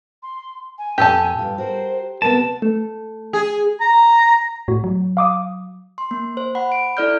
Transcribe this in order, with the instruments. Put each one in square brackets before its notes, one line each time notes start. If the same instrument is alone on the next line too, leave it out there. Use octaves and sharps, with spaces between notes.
[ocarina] C6
G#5
[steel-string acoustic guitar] F2 A#2 [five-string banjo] G4 A4 A5
[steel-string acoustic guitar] G2 F4
[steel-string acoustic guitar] F#4 A#4 [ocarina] C5
[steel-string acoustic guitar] D2 C3 B3 [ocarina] A#4 [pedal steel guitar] A5
[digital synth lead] A3
[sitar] G#4
[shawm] A#5
[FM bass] A2 [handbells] F#4
[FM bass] F#3
[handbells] F5 D6 D#6
[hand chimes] C6
A#3
C5
F#5 B5
D7
E4 A4 D5 F6 G6